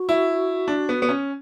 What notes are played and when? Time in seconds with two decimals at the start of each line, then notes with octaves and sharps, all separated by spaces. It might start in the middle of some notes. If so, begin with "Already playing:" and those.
Already playing: F#4
0.09 E4
0.68 D4
0.89 B3
1.02 B3
1.09 C#4